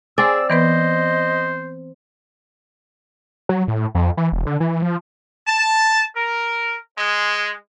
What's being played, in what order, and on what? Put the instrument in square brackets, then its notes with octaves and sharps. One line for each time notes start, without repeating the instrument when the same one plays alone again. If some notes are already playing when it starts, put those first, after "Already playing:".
[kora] C4 D5 [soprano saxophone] G#4 [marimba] G#5 [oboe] E6
[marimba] E3 B3 B4 [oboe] C5 [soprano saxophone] D#5
[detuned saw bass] F#3
A2
F2
E3
E1
D3
E3
F3
[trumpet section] A5
A#4
G#3